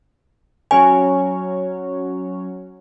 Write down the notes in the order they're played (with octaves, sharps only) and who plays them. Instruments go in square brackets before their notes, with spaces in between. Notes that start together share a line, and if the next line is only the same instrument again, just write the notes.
[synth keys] F#3 C#4 C#5 [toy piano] G#5